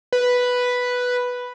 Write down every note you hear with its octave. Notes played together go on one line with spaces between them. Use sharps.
B4